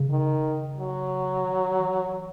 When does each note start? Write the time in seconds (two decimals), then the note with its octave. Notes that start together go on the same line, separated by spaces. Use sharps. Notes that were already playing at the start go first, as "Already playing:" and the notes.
Already playing: C#3
0.10 D#3
0.77 F#3
1.44 D#3
1.78 E3